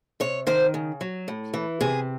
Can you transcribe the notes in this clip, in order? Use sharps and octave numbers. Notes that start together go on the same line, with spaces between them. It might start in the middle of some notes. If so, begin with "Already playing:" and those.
C3 C#5
D#3 C5
C#3
F#3
A2
E3
C3 G#4